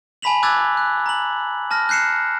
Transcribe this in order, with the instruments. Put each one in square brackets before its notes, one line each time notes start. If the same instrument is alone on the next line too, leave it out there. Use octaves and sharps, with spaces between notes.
[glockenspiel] G#5 A5 B5 B6 F7 F#7
D6 E6 F#6 G#6 A6
F#6
A#5 F#7
A5 F6 A#6
F#6 G6 C7 C#7 E7